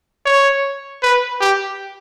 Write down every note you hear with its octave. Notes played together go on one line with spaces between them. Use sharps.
C#5
B4
G4